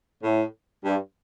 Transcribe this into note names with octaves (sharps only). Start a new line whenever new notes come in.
A2
G2